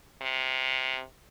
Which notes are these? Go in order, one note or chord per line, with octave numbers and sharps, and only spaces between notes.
C3